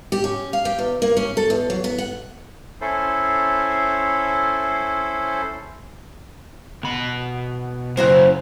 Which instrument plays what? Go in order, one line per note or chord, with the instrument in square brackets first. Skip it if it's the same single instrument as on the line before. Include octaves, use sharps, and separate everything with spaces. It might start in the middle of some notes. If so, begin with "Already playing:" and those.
[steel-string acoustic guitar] G4
C#4
F5
G4
E2
A#3
C#4
A4
E2
F#3
B3
F#5
[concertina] C#4 E4 A4 C5
[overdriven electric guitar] B2 B5
[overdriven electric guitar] F#2 C#3 [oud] E4 F#4 C5